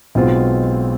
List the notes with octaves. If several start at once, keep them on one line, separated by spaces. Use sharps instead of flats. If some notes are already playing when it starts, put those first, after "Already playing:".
B1 B2 G#3 C4 F4